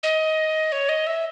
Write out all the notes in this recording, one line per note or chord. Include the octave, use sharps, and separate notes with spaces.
D#5
C#5
D#5
E5